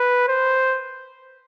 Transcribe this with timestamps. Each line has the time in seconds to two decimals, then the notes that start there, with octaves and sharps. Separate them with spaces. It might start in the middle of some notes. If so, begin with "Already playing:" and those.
Already playing: B4
0.28 C5